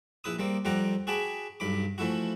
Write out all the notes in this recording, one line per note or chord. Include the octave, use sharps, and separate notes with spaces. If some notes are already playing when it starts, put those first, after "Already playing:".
A#1 E4 B4 D#6
G3 A#3 C4
F2 G3 C4 F#5 A#5 D6
F#4 G#4 G5 A5 B5 D6
B1 G2 B5 D6
E3 F3 A3 E4 F#4